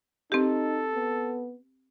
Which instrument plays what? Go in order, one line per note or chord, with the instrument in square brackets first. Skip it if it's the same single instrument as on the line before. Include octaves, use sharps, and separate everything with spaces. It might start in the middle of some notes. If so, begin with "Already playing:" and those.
[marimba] C4 G4 [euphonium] D#4 [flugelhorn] A4
[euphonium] B3